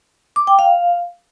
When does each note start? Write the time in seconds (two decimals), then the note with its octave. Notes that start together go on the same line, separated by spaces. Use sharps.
0.36 D6
0.47 G5
0.59 F5